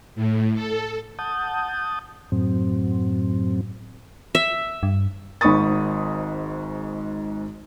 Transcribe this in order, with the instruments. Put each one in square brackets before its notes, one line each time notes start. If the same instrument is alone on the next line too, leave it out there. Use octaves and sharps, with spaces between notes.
[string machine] A2
A4
[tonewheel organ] F#5 A5 D#6 G6
F#2 A2 F#3 C4
[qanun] E5
[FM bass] G2
[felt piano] G#1 G#2 B5 C#6 D#6 A6